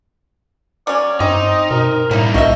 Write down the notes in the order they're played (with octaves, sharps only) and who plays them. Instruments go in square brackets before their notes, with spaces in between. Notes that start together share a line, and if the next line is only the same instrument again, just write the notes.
[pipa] F#3 C#4 [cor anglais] D5
[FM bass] G2 [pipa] C4 [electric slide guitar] D#4 [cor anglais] D#5
[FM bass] B2 [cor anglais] A#4
[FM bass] A2 [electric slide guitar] G3 A#3 [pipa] D#4 E4
[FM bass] C2 [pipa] F3 D4 E5 [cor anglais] F#4 [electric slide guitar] D#5